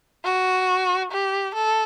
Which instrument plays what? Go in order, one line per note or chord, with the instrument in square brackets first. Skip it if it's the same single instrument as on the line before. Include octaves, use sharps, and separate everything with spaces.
[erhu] F#4
G4
A4